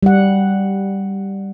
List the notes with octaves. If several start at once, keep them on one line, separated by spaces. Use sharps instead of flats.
G3 F#5